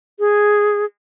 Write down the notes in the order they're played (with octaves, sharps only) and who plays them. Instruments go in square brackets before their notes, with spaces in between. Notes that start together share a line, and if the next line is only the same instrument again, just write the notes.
[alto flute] G#4